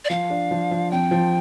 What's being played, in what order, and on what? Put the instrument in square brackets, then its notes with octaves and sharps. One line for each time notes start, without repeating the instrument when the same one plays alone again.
[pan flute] D5
[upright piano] F3 [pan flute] F5
[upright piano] D4
F3
F3
[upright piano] F2 [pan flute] G5
[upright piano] F3